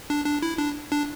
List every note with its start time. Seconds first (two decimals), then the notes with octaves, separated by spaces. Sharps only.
0.10 D4
0.26 D4
0.42 E4
0.58 D4
0.92 D4